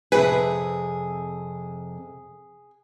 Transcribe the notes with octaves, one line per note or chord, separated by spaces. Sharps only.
F2 C3 G#4 B4